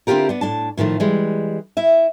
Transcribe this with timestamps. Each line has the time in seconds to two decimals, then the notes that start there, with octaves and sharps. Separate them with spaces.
0.07 D3 C4 E4 F4 G4 A#4
0.29 B3 D4
0.41 A2 D4 A5
0.77 A2 D#3 F3 A3
1.00 E3 G3 G#3
1.77 E4 E5